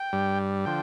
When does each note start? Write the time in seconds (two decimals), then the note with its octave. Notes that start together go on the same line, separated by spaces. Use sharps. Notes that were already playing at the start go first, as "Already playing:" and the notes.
Already playing: G5
0.13 G2 G3
0.66 D3 F3 G5